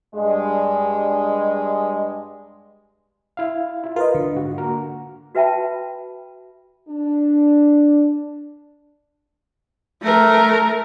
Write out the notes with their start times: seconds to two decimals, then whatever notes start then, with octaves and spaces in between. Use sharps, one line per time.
0.15 G2 G#3
3.37 E4 F5
3.83 E4 F4
3.96 F4 A#4 B4 D#5
4.15 D3
4.35 G#2 F#4
4.58 A#3 F#4 A#4
5.35 F#4 B4 E5 G5 A5 B5
6.89 D4
10.03 A3 A#4